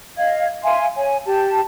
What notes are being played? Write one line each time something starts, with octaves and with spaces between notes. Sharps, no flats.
D#5 F5 G#6
E5 F5 G#5 C6
C#5 G#5
G4 A5